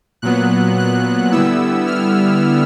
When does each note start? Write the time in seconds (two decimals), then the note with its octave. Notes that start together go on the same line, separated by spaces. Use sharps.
0.22 A#2 F#3 B3 F#6
0.78 F#6
1.32 D3 G3 B3 E4 E6
1.87 F6